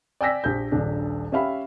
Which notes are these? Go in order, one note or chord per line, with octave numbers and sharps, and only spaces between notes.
D5 G5 G#5 E6 A#6 B6
A#1 G4 G6
D#1 A#1 D4
C#4 G4 E5 F5 B5